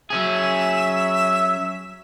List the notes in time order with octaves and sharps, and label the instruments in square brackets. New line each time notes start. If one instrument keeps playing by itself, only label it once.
[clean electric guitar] F#3 C#4 G#4 [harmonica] E5